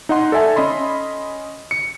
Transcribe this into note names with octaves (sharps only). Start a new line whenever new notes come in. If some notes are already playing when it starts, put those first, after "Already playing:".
D#4 D#5 F#5 C6
A4 D5 E5 G#5 A5
C#4 D#5 B5 C6
C#7